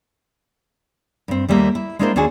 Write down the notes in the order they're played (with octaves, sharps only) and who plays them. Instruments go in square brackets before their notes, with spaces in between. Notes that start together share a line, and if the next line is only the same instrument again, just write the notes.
[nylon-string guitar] G2 C4
D#2 G3 A3 A#3
E4
G#3 A#3 D4 E4 A#4 C5
D#2 D4 F4 F#4 G#4 G#5